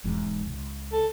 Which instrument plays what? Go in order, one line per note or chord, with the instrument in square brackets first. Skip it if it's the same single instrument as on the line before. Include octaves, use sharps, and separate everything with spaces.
[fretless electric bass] E1 E2 G#2
C#2
[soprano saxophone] A4